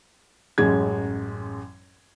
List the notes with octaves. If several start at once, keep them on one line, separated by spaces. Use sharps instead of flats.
A1 F#2 G#3 G#6